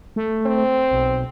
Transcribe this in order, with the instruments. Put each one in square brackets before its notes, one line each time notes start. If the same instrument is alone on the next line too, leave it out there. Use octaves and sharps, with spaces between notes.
[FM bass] A3
[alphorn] C4
[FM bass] B1